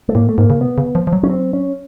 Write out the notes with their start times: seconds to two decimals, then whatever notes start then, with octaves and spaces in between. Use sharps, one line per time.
0.09 A3
0.15 A2 A#3
0.29 A3
0.38 G#2 A#3
0.50 C#3
0.61 C3 B3
0.78 C#3
0.95 F3
1.07 F3
1.13 F#3
1.23 C#4
1.30 C4
1.53 C#4